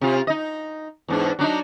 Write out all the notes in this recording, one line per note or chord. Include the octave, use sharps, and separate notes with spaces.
C3 F4
D#4 D#5
E2 G#2 D4
F#3 D4 D#4